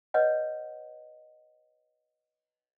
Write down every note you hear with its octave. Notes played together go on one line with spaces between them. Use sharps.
B4 C#5 D#5 F#5